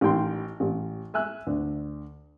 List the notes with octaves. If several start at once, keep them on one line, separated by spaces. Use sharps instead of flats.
A1 D#3 G5 C6
A1
E5 G#5 E6 F#6
D2